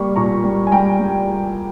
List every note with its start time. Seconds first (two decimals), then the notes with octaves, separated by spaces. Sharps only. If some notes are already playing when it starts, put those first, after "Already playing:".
Already playing: G3 A#3 C#6
0.16 A#2 A#5 C#6
0.44 G3
0.67 G#5
0.72 G3 G5 A#5
1.00 G3